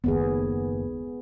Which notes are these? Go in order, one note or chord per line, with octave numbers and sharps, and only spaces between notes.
F#1 D#2 B3 G#4